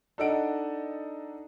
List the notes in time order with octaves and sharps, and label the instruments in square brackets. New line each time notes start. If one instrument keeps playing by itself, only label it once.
[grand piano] D4 D#4 A4 D#5 F#5 D7